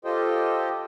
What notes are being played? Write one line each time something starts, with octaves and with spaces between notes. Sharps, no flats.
F4 G4 A4 C5 D#5 G5